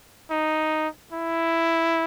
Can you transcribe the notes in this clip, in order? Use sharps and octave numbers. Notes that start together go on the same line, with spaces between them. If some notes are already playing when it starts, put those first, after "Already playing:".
D#4
E4